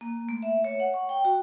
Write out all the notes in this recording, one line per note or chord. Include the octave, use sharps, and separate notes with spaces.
A#3
A3
E5
C#5
F#5
C#6
G5
F#4